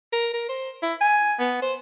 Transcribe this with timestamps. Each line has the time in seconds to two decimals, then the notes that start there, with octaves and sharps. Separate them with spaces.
0.13 A#4
0.34 A#4
0.49 C5
0.83 E4
1.01 G#5
1.39 B3
1.62 C5